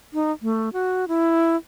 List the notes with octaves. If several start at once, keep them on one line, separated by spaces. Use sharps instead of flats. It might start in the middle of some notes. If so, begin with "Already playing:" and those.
D#4
A3
F#4
E4